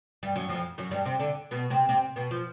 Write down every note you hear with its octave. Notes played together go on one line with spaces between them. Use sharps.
G2 G3
F#2 F#3
F2 F3
F#2 F#3
G2 G3
C3 C4
D3 D4
B2 B3
C3 C4
C3 C4
B2 B3
F3